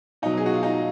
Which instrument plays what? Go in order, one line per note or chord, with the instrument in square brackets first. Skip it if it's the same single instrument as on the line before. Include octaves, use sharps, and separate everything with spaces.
[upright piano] B2 F#3 D#4
G#4
F#4
F4
D#4